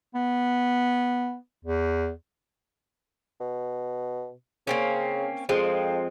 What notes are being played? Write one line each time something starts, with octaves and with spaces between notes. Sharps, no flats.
B3
E2
B2
C#3 A#3 C4 C#4
F2 F3 G#3 C4